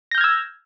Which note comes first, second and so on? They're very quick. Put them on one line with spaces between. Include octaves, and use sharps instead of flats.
A#6 G6 F6 G#6 E6